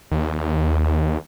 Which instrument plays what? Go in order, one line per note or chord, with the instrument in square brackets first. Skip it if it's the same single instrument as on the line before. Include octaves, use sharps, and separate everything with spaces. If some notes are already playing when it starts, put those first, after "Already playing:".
[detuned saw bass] D#2